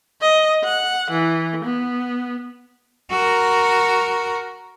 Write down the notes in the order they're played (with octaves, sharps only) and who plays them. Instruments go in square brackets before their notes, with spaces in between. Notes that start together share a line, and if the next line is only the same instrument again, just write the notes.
[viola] D#5
F#5
E3
B3
[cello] F#4 A#4